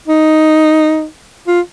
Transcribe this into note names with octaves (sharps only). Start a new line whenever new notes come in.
D#4
F4